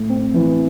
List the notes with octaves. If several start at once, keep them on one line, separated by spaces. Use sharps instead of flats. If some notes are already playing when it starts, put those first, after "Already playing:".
Already playing: A2 A3
C4
E3